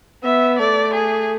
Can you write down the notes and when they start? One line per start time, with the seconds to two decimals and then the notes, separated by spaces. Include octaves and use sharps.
0.24 B3 E5
0.59 A3 D5
0.94 G#4